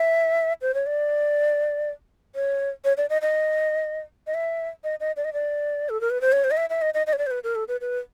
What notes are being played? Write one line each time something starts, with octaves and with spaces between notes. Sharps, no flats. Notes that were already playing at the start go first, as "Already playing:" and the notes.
Already playing: E5
C5
C#5
D5
C#5
C#5
D5
D#5
D#5
D#5
E5
D#5
D#5
D5
D#5
D5
A4
A#4
B4
C5
C#5
C5
D#5
E5
E5
D#5
D#5
D#5
C#5
D5
C5
B4
A#4
A4
B4
B4